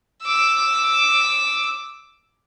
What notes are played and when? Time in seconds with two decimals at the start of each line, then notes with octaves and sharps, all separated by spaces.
0.23 D6 E6